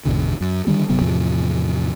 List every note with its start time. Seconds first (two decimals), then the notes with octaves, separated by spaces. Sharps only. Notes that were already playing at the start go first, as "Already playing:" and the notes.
0.05 G#1 E2 B2 D3
0.41 F#2
0.67 D3 D#3 G3 B3
0.89 G1 C3 F#3 B3
1.01 E2 A2 C3 F3